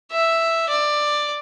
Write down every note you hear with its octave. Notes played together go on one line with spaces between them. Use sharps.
E5
D5